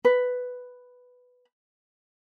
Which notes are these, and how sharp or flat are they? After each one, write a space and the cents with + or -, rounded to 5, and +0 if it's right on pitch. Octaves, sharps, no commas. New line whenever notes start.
B4 +5